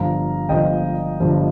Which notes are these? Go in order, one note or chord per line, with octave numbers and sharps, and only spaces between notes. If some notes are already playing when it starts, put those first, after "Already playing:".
Already playing: G1 G2 F3 F5 A#5
G1 G2 F3 D#5 G5
G1 G2 F3